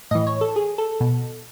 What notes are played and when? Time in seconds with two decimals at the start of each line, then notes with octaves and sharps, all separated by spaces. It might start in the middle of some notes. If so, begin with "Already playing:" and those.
0.11 A2 E3 D#5
0.27 C#5
0.41 A4
0.56 G#4
0.78 A4
1.00 B2